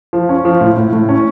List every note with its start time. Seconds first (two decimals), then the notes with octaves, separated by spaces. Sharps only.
0.13 F3
0.29 C#4
0.45 F3
0.61 A2
0.77 A2
0.93 A2
1.09 C#4